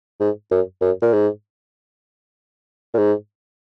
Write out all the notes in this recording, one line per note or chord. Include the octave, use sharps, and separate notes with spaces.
G#2
F#2
F#2
A#2
G#2
A#2
G#2